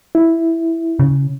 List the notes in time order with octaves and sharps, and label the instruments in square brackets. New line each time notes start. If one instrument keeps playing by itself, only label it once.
[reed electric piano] E4
[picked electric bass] C#3